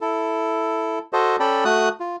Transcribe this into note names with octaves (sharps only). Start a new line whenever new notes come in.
E4 A4
F#4 A4 C5 D#5
C#4 A4 D5 G5 B5
A3 F#4 D#6 F#6
F4